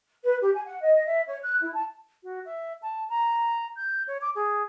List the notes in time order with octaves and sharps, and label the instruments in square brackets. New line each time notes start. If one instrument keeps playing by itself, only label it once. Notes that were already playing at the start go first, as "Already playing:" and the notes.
[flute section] B4
G4
G#5
F#5
D#5
E5
C#5
F#6
E4
A5
[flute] F#4
E5
A5
A#5
G6
C#5
D6
G#4